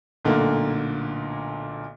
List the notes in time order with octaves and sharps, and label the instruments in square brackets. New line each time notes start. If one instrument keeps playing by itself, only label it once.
[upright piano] B1 A#2 D3 A3 A#3